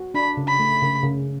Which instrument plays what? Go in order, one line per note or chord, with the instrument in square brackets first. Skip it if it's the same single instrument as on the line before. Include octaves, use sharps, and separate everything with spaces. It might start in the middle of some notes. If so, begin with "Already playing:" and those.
Already playing: [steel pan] F#4
[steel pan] D4 [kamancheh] B5
[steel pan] C#3
[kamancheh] B5
[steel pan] A3
C#3
C#3